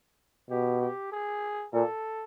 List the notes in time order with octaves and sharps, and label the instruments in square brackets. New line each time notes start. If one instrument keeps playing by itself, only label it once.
[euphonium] B2 [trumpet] G4
[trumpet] G4
G#4
[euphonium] A#2 [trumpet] A4